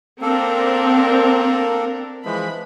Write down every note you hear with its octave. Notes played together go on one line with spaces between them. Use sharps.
A#3 C4 D4 A4 A#4
E3 F3 G#3 B5